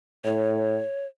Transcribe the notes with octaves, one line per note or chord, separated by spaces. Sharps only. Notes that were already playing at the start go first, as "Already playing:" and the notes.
A2 C#5